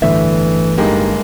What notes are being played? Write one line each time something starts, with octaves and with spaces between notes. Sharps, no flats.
G1 A2 D3 E3 E5
G2 G#3 A#3 D#4 G4